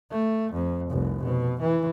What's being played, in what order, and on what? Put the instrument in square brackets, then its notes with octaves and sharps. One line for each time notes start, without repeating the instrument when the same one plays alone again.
[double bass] A3
F2
F1 C2
B2
E3